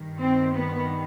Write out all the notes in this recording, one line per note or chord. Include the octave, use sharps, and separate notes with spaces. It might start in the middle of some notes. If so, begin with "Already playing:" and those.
Already playing: G2 D#3
C4
B3